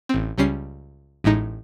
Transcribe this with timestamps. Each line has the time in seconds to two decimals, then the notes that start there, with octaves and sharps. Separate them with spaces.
0.09 A1 C4
0.38 C#2 G3 C#4 C7
1.24 A1 A2 G#3 D#4